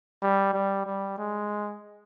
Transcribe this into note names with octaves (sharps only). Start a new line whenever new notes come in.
G3
G3
G3
G#3